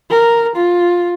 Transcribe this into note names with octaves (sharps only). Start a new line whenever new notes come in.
A#4
F4